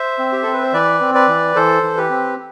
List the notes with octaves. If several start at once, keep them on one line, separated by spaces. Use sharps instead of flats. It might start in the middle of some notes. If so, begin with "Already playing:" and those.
Already playing: C5 E5
C4
G4
C4 A4
B4
C5
E3 B4 D5
C4
B4 D5
E3
E3 A4 C5
E3
G4 B4
C4